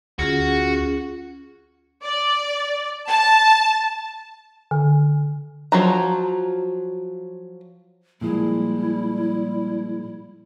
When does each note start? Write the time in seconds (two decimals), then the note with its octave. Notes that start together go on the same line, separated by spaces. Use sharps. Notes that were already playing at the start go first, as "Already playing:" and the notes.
0.19 D2 C#4 F4 F#4 G#4
2.04 D5
3.09 A5
4.71 D3
5.72 F3 F#3 A#5
8.21 A#2 F3 G3 G#3 E4